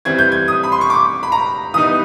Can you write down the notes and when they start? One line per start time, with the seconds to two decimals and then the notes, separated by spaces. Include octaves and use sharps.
0.05 E3 G3 C4 G#6
0.19 G6
0.32 G#6
0.48 D#6
0.63 B5
0.72 C6
0.81 C#6
0.90 D6
1.23 B5
1.32 A#5
1.74 E3 G3 B3 D#4 D#6